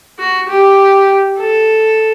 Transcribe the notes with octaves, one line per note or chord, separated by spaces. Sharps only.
F#4
G4
A4